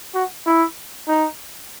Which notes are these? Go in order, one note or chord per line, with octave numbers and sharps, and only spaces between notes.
F#4
E4
D#4